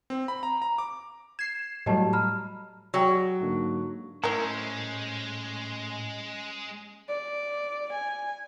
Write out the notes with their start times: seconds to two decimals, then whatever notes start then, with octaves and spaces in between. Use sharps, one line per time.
0.10 C4
0.28 B5
0.43 A#5
0.62 A#5
0.78 D6
1.39 G#6 C7 E7
1.86 A2 F#3 G3 G4 D#5 A5
2.13 A#5 B5 F6
2.94 F#3 G#4 G5
3.40 G#2 D3 A#3
4.24 A2 G#3 C#4 E4 A#4 C5 C#5
7.09 D5
7.93 G#5